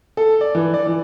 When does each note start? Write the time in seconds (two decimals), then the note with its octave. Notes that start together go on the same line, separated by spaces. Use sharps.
0.17 A4
0.41 D5
0.55 E3
0.74 D5
0.87 E3